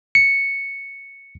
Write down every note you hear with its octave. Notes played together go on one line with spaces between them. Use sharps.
C#7